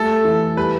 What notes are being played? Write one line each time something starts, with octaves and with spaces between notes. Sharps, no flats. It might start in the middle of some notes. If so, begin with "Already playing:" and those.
Already playing: G3 A3 A4
E3
G3 B4